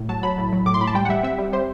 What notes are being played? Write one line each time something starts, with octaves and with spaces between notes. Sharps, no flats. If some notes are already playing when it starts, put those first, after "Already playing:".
Already playing: A2
F#3 A5
F#3 B5
A2
F#3
A2 D6
C6
A2 B5
A5
G3 G5
F#5
G3 E5
C4 E5
G3
G3 C5